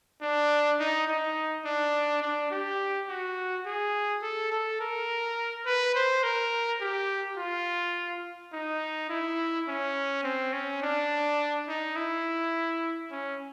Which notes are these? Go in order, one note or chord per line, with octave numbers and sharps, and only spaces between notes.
D4
D#4
D#4
D4
D4
G4
F#4
G#4
A4
A4
A#4
B4
C5
A#4
G4
F4
D#4
E4
C#4
C4
C#4
D4
D#4
E4
C#4